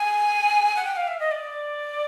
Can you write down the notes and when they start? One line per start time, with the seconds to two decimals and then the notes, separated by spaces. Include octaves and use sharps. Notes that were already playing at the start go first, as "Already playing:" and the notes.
Already playing: G#5
0.76 F#5
0.85 G5
0.96 F5
1.08 E5
1.20 D#5
1.31 D5